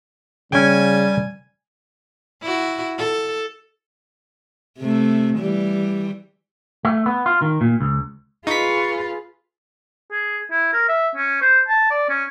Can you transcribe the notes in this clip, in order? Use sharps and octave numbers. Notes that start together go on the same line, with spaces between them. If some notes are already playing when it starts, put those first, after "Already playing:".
C#3 G3 C#4 G5 G#5
E4 F#4
A4
C3 A3
E3 G3
A3
B3
F4
D#3
A#2
C#2
D#4 F4 G#4 B4 C#6 B6
G#4
E4
A#4
E5
C#4
C5
A5
D5
C#4